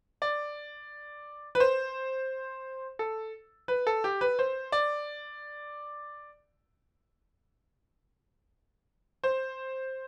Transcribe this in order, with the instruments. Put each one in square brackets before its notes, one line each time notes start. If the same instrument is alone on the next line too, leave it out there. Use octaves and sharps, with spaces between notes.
[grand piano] D5
B4
C5
A4
B4
A4
G4
B4
C5
D5
C5